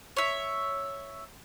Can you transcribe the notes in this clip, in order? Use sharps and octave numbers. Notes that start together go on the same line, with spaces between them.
C#5 E5